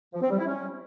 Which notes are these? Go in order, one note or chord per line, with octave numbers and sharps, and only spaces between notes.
F3
C4
G3
E4
C#4